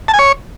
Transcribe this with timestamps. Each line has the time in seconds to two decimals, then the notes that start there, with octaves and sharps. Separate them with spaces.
0.08 A5
0.14 G#5
0.19 C#5